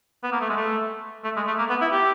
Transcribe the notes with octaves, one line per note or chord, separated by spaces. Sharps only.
B3
A#3
A3
G#3
A3
A3
G#3
A3
A#3
B3
E4
G4